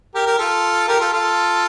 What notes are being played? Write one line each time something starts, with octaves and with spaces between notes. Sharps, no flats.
G4 A#4
G4 A#4
F4 A4
G4 A#4
F4 A4
F4 A4